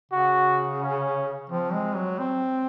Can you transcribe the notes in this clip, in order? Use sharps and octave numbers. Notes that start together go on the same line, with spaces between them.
C#3 F#4
C#4
F3 C4
G#3
F#3
C4